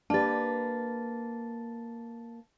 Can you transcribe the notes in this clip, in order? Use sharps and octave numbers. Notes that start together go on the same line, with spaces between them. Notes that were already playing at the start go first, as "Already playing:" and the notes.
A#3 D4 G4 B4 A5 A6